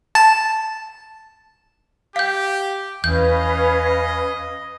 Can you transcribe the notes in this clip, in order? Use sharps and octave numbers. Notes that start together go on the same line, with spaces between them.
A5
G4 F5 G6
E2 C#4 B4 D#5 F5 G6